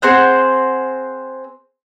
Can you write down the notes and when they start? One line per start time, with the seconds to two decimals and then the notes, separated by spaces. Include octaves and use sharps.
0.02 C4 G#4 C5 F#5